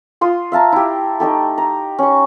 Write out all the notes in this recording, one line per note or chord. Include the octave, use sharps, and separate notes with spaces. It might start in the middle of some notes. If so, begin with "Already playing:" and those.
F4 C6 D#6
E5 F5 A5 A#5
E4 G4
A3 D#4 G4 A4
A#5
C#4 C#6